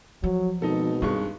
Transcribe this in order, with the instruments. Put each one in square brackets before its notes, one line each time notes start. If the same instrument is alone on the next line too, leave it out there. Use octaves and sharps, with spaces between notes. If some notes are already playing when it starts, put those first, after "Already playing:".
[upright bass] F3 [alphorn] F#3
[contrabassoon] G#1 [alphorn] B2 [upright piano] D#4 A4
[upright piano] G2 G#3 C#6 [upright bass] D4